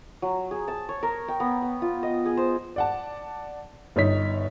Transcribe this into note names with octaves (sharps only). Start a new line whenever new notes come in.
F#3
G#4
A5
C#5
A#4
G5
B3
B3
F4
D#5
G#4
C5
D5 F#5 A5
G1 D#4 C#5 B6